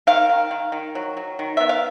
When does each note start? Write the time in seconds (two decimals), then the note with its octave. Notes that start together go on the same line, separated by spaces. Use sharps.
0.07 D#3 F5
0.29 D#3
0.51 D#3
0.72 D#3
0.95 F#3
1.17 F#3
1.39 D#3
1.57 B3 E5
1.69 F5